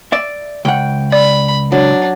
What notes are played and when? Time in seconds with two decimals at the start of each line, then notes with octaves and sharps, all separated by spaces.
0.12 D5 E5
0.65 C#2 F#5 G5
1.12 D5 B5
1.72 F#3 D4